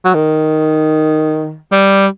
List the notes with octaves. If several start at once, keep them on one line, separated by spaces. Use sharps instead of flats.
F#3
D#3
G3